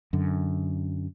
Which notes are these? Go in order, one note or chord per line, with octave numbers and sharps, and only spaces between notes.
F#2 D3